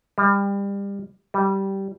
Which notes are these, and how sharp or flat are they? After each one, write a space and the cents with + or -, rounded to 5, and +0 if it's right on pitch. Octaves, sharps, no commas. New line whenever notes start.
G3 +30
G3 -10